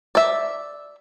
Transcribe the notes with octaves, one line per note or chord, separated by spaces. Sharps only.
D5 E5